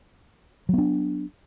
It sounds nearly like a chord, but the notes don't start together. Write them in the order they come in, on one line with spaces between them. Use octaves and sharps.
F#3 B3 D4